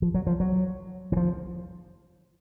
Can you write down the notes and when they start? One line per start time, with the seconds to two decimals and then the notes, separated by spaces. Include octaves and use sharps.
0.02 F3
0.14 F#3
0.27 F3
0.40 F#3
1.12 E3
1.17 F3